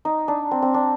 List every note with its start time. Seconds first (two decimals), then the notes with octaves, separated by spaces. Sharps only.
0.05 D#4
0.28 D4
0.51 C4
0.62 C4
0.74 D4